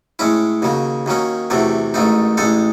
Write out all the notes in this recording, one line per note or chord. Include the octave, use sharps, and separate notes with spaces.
A2 G#3 C#4 E4
D#2 C#3 F#3
D#2 D#3 F#3 C#4
E2 C3 F#3 A3
A1 G#2 D#3 A3 D#4
A1 A2 G#3 D#4 A4